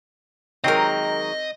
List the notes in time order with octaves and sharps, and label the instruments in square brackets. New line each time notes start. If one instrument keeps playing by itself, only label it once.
[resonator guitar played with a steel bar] D#3 F#3 G#3 [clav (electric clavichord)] C4 [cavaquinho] G4 A#4 [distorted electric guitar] D#5